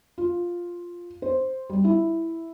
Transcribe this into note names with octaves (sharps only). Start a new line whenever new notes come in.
F4
C5
G3
E4